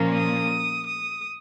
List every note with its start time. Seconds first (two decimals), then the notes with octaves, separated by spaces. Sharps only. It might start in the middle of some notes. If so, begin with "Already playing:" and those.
Already playing: A#2 F3 A#3 C#4
0.16 D#6
0.87 D#6